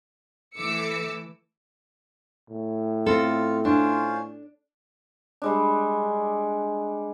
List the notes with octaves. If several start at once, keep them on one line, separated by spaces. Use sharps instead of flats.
E3 A3 D6 E6 C#7
A2
C4 F4 A4
C#4 D4 F4 C5
G3 G#3 D4